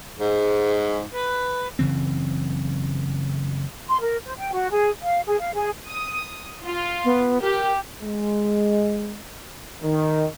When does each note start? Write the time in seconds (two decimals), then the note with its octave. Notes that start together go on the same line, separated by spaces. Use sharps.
0.18 G#2
1.13 B4
1.79 F#1 C#3 E3 C4
3.87 C6
4.01 A#4
4.26 C5
4.37 G5
4.54 F#4
4.71 G#4
5.02 F5
5.26 G#4
5.40 F5
5.54 G#4
5.89 D#6
6.65 F4
7.04 B3
7.41 G4 A#4
8.02 G#3
9.82 D#3